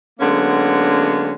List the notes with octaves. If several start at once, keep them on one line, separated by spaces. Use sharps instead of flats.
D3 F#3 G#3 A#3 B3 C#4